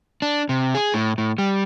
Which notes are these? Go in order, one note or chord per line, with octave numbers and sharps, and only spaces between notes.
D4
C3
G#4
A2
A2
G3